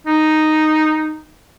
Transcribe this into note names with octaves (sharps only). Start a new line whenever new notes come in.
D#4